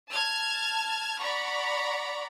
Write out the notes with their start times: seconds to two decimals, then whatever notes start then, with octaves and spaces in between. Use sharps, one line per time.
0.12 A5 F6 G#6
1.21 D5 F#5 A#5 B5 C#6